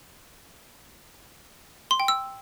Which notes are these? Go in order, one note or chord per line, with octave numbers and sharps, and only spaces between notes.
C6
G5
E6